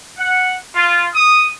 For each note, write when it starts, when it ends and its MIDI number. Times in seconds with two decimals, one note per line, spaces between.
0.18 0.55 78
0.76 1.07 65
1.14 1.47 87